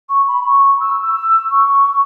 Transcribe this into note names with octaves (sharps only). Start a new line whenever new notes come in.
C#6
B5
C#6
E6
E6
C#6